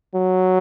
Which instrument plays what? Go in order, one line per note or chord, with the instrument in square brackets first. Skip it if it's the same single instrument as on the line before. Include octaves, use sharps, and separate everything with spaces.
[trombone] F#3